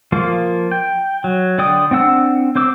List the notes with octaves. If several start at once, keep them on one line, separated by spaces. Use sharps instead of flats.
F3 A#3 F4
G5
F#3
D3 D5 G5 D#6
C4 D4 F#5 E6
C4 C5 D6 E6